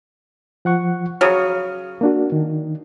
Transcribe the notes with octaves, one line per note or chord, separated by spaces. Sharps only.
F3 F#5 C#6
C#3 F#3 C#6 D#6 F6
A#3 D4 F#4
D#3